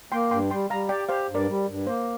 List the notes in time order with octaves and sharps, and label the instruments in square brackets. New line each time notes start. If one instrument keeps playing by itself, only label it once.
[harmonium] A#3 [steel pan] G5 C6
[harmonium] G2 [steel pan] G5 C6
[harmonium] G3 [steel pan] G5 C6
[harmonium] G3 [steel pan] F5 A#5
[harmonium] G4 [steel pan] D5 G5
[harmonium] G4 [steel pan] C5 F5
[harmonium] G2
[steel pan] A#4 D5
[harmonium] G3
G2
[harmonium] A#3 [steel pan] C5